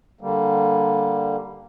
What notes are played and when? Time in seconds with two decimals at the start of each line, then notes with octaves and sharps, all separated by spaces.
0.21 D3 G3 A#3